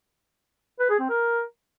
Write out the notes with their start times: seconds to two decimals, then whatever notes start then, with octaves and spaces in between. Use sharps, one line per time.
0.79 B4
0.89 G#4
1.00 C4
1.10 A#4